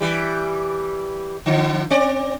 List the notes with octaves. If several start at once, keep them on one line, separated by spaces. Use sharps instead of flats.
E3 G3
D3 F3
C4 D5